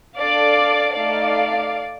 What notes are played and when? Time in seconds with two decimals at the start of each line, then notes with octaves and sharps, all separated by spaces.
0.17 D4 A4 D5 F5
0.96 A3 D#4 A4 D5 F5